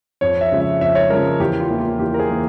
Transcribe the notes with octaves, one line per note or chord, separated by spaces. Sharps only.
F2 C#5
E5
C#3 F3 G#3
E5
F2 E5
C#5
C#3 F3 G#3 A#4
E2 G4
F4
E3 A#3
F4
E2 G4
A#4
G#4
E3 A#3